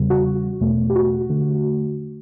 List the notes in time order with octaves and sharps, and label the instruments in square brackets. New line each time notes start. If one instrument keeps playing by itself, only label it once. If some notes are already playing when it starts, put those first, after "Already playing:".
Already playing: [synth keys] E2 C#3 G3
F#4
E2 B2 A3
G4
F#4
D3 A3